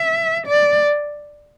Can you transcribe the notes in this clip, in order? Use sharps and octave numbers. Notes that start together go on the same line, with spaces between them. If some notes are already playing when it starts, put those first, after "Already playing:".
Already playing: E5
D5